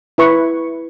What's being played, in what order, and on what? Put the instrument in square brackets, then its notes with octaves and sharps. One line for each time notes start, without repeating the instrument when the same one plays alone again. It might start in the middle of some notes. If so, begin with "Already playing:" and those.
[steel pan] E4 B4 C#6